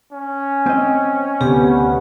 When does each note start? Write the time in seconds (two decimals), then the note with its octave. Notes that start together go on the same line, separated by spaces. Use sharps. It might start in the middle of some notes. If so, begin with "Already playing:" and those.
0.13 C#4
0.66 C4 D#5
1.41 D2 C3 B3 G4